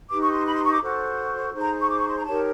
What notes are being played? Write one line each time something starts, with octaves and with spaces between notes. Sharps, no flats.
D#4 G4 B4 D6
C#6
C6
B5
C6
C#6
D6
F#4 A4 C5
D#4 G#4 C5
A#5
C#6
D6
C#6
C6
A#5
D#4 G4 A#4 C#5 A5